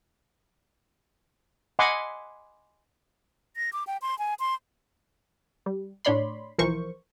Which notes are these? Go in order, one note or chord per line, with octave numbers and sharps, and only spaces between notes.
D#5 F#5 G#5 B5 C6 D6
A#6
D6
G5
C6
G#5
C6
G3
A2 D4 C#5 D5 B5 C6
B1 E3 F3 A#4 C5 C#6